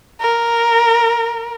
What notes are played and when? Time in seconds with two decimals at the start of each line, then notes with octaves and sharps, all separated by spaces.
0.21 A#4